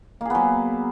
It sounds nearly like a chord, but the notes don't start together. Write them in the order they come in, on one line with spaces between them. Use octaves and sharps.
A#3 G#4 B3 F#3